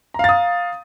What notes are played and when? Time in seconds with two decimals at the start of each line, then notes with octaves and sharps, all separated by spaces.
0.14 A#5
0.19 F5
0.24 A6
0.29 D#6